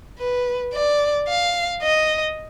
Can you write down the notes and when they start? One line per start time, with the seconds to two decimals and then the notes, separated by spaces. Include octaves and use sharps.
0.19 B4
0.73 D5
1.28 F5
1.83 D#5